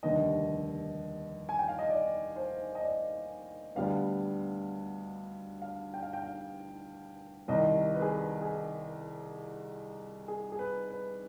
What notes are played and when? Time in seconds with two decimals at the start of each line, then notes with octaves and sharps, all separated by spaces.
0.03 F1 D#2 D3 G3 D#5
1.49 G#5
1.59 G5
1.68 F5
1.79 D#5
1.90 D5
2.36 C5
2.75 D#5
2.82 D5
3.75 D2 D3 G3 B3 F5
5.62 F5
5.94 G5
6.03 F5
6.13 G5
6.24 F5
7.48 C2 C3 D#3 D#5
7.94 B4
8.02 G#4
8.09 B4
8.42 G#4
10.28 G#4
10.52 G#4
10.59 B4
10.90 B4